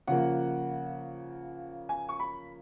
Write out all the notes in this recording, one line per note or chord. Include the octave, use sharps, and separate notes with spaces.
C#3 F3 A#3 F#5
G#5
C#6
B5